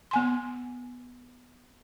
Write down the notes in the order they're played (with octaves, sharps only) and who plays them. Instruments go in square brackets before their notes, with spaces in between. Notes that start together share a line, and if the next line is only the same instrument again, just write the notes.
[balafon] B3 G#5 C6